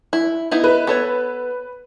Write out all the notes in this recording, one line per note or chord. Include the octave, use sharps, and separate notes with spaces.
E4
B3 D#4 E4
B4
B3 A4 C#5